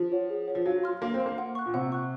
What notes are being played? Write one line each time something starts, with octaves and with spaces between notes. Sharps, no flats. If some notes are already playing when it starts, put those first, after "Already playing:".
Already playing: F3
C#5 F#5
G#4
C#5 F#5
F3
F#3 F5
C6 F6
A#3 F5
C4
C6 F6
A#3
F#5
C#6 F#6
A#2
C3 F#5
C#6 F#6